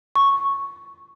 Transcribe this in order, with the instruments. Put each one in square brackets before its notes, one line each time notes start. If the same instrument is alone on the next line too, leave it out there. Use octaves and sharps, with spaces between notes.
[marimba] C#6